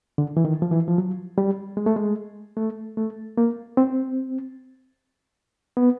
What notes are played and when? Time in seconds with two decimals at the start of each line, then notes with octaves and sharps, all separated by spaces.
0.18 D3
0.37 E3
0.45 D#3
0.62 F3
0.71 E3
0.88 F3
0.98 F#3
1.38 G3
1.77 G#3
1.86 A3
1.96 G#3
2.57 A3
2.97 A3
3.38 A#3
3.77 C4
5.77 B3